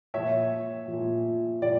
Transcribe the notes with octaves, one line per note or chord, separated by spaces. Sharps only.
A#2 F3 C#5 E5
F3
A#2
A#2 F3 D5